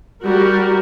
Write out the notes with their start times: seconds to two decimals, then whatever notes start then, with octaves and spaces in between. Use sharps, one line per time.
0.23 G3 F#4 A#4